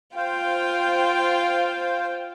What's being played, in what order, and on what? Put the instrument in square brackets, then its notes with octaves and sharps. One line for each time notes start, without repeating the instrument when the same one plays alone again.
[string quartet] F4 G5 [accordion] C5 F5